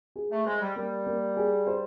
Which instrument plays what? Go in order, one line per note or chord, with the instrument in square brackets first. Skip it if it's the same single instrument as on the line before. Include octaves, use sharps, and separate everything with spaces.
[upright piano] G#4
[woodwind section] A3
[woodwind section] G#3 [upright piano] C5
[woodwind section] G3
[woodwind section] G3 [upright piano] A#3
[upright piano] A#3
G#4
C5